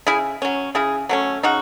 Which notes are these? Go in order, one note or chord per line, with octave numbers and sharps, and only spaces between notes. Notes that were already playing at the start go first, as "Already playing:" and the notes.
C#3 E4 G#4
F#3 C#4
C#3 E4 G#4
F#3 A3 C#4
C#3 D#4 F#4